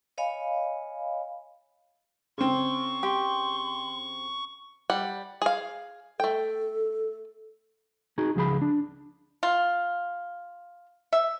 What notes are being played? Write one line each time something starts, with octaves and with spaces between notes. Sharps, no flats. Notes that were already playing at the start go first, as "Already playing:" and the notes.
C#5 D#5 F5 G#5 B5
C#3 C4 C6 C#6
G4 C6
G3 F#5
G#4 F5
A3 A4 G5
D#4 F#4 G#4
C#2 F3 G#4 B5
D4
F4
E5